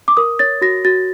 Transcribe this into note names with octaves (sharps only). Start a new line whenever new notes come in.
D6
A#4 D#6
C#5 A6
F#4 A#6
F#4 A6